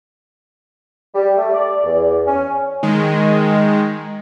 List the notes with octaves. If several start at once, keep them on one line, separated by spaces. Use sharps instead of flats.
G3
A3
D5
E2
C#4
D#3 G#3